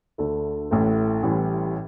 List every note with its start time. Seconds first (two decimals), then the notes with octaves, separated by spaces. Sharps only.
0.18 D2 D3 A3 D4 A4
0.71 A1 A2 A3
1.23 A1 A2 E3 G3